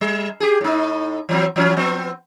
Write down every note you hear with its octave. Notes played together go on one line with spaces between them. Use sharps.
G3
G4 G#4
A2 D#4
E3 F#3 C4
E3 F#3 C#4
F3 B3 C4